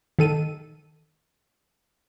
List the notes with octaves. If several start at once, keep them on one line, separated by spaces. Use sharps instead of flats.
D#3 A4 D#7